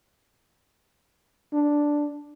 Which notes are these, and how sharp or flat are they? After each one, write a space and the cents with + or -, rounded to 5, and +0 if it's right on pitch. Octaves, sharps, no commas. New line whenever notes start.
D4 +0